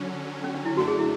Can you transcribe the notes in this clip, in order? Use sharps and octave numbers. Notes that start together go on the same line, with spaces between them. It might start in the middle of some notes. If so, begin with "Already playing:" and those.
Already playing: D3 F#3 C#4
C#4
D4
E4
F#2 D3 A3 D4 F#4
G#4
E4